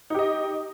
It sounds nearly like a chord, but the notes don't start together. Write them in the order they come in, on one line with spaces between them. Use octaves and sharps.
D#4 G4 D#5